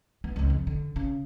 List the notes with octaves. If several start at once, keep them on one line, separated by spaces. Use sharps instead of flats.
B3
C#2 C#3
F2
D3
C#3